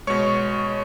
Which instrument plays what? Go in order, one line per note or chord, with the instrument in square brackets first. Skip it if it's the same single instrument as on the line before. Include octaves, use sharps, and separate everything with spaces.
[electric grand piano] B2 G#3 C#5 C#6